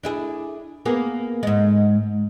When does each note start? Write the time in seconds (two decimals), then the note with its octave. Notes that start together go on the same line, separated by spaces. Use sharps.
0.03 D4 E4 G#4
0.85 A#3 B3 G#4
1.43 G#2 G#3